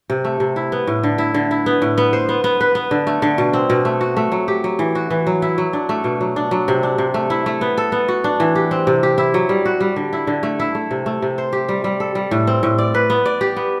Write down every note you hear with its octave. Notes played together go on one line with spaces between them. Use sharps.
C3
A3
C3
E4
B3
A2
D3
E4
D3
E4
B3
A2
B3
C5
B3
B3
B4
B3
D3
A3
D3
B2
C4
B2
A3
F#4
A3
F#3
G4
F#3
E3
F#4
E3
F#3
E4
F#3
D4
A3
B2
F#3
D4
F#3
C3
D4
C3
A3
E4
A3
B3
A4
B3
F#4
D4
E3
G4
C4
C3
G4
E4
F#3
G3
F#4
G3
D3
E4
D3
A3
E4
A3
C3
A3
C3
C5
G4
G3
G3
A4
G3
A2
C4
A2
D5
B4
B3
D5
G4
B3